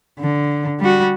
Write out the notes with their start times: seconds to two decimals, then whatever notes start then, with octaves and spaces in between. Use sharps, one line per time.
0.20 D3
0.80 G3 F#4